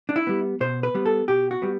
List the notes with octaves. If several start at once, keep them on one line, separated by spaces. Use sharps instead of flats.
D4
E4
G3 B3
B2 C5
B4
G3 B3
A4
B2 G4
F#4
G3 B3